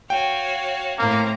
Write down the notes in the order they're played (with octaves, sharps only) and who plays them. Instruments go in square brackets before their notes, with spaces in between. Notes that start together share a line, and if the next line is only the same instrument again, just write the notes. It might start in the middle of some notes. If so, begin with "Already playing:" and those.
[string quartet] F#4 C#5 F5 [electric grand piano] G5
[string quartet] A2 C4 A#5 [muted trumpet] A#3